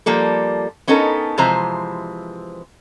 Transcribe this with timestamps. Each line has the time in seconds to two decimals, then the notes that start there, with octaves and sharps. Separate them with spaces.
0.06 F3 G3 A#3 A4
0.88 B3 C#4 D#4 A4 A#4
1.38 C3 E3 F3 G#3 C5 A#5